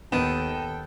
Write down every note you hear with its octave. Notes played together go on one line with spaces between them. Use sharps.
D#2 D#3 B3 A4 G5